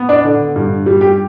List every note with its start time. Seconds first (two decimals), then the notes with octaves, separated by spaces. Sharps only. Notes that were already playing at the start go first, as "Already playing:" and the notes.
Already playing: B3
0.09 D4 D5
0.24 D3
0.56 G2
0.86 G3
1.01 G3 G4